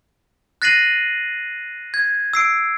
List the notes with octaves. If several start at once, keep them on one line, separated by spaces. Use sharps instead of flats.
F#6 A6 A#6 C7 D#7 F#7
G#6
E6 C7 D7